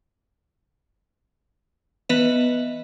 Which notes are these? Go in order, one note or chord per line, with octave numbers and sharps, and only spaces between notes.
E3 B3 B4 D#5 E5